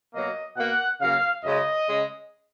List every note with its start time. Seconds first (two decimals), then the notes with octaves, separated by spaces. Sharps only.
0.13 B2 F#3 A#3 D#5
0.57 B2 A#3 F#5
1.00 C#3 F#3 A#3 F5
1.44 F#2 C#3 G#3 D#5
1.87 C#3 G#3